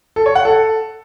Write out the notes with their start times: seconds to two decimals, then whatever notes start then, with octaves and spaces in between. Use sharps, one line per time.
0.16 A4
0.26 C#5
0.35 F#5
0.45 A4